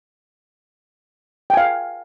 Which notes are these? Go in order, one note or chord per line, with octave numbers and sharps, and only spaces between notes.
F5 G5 G#5